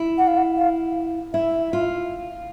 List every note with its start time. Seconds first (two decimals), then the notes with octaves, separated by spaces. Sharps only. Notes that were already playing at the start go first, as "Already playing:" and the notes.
Already playing: E4
0.18 F#5
0.27 F5
0.37 F#5
0.56 F5
1.33 E4 E5
1.73 F4